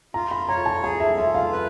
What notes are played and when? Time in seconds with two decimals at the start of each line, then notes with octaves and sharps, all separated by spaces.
0.14 F4 A#5
0.31 B5
0.48 C#5 A#5
0.66 A5
0.83 G#4 A5
1.00 E5
1.17 F4 E5
1.35 F5
1.52 B4